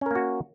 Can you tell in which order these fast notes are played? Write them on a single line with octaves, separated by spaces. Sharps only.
C#4 A#4 A#3 F#4